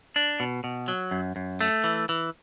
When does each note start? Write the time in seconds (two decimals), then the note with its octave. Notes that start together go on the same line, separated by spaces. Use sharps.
0.16 D4
0.40 B2
0.64 B2
0.88 F#3
1.11 F#2
1.36 F#2
1.61 A3
1.84 E3
2.09 E3